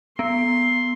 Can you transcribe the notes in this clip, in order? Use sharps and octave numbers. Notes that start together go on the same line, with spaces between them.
B3 C6